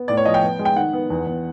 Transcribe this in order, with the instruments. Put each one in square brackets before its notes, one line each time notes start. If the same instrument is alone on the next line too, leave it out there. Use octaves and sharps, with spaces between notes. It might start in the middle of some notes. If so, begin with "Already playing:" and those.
Already playing: [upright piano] B3
A2 D5
C#5
F3 D#5
G5
B3
G#3
G5
D#3 F#5
B3
E2
E2